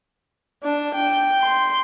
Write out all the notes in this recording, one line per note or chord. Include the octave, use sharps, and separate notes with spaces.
D4
G5
C6